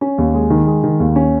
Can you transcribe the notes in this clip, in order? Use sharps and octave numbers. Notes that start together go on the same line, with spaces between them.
C#4
D#2
G#3
D#3
G#3
D#3
D#2
C#4